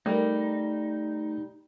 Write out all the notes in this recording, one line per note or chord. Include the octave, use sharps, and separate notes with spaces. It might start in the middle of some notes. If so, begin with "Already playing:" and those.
G3 A3 D#4 A#4